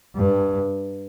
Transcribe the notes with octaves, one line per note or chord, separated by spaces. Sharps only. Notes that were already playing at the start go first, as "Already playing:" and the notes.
G2